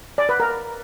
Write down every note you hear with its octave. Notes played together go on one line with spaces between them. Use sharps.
D5
B4
A#4